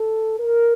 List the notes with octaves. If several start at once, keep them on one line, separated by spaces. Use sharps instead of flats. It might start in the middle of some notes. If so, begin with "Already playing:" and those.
Already playing: A4
A#4